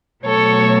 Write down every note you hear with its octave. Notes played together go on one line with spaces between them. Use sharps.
B2 F#3 A3 A4 C#5